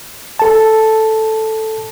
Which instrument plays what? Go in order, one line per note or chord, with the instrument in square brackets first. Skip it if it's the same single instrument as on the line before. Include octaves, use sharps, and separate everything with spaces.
[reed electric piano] A4 A5